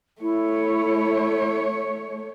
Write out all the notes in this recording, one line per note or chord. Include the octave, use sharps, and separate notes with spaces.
A3 E4 C#5